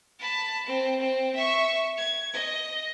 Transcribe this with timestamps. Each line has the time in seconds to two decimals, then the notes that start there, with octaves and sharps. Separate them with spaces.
0.19 A5 B5
0.66 C4
1.00 C4
1.35 E5 C#6
1.97 G#6
2.33 D#5